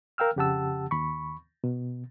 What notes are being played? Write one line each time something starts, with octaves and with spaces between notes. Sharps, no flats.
A#4 F5 G5 E6 F6
F2 C#3 G4 F#5 A5 E6
D#2 B5 C#6
B2